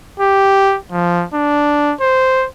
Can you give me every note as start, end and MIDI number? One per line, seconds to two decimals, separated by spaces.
0.20 0.77 67
0.92 1.24 53
1.34 1.94 62
2.01 2.46 72